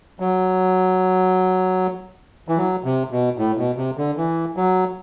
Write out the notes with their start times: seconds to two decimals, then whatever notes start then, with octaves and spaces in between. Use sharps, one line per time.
0.20 F#3
2.48 E3
2.57 F#3
2.84 C3
3.11 B2
3.38 A2
3.57 B2
3.77 C3
3.97 D3
4.17 E3
4.57 F#3